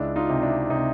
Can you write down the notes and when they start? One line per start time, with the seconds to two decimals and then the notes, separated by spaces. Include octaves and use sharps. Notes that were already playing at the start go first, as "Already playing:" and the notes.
Already playing: C#2 D4 E4
0.16 D#4 F4
0.29 C3
0.42 D4 E4
0.70 C3 D#4